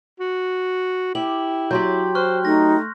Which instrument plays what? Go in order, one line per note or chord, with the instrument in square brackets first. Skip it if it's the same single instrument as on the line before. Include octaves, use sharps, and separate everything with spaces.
[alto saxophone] F#4
[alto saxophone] E4 [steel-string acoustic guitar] G4 [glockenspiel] F#7
[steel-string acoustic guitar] F#3 G4 [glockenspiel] C6 G6
[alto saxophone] C5 [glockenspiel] C#6 F6 F#6
[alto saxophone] A3 [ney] D#4 [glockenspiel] A#6